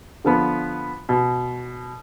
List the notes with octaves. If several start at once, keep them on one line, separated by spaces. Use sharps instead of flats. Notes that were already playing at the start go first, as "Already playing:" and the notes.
D3 F3 B3
B2